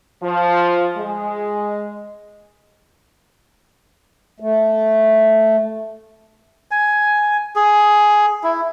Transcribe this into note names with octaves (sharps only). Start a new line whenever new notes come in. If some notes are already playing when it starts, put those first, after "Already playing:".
F3
G#3
A3
G#5
G#4
E4